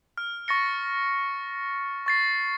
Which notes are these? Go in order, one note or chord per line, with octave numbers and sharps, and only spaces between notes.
F6
C#6 A6 A#6 C#7
C#6 A6 C7